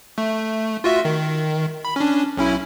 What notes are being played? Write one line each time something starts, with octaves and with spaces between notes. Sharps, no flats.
A3
F4 F#4 E5
D#3
B5
C#4 D4
B1 C#4 E4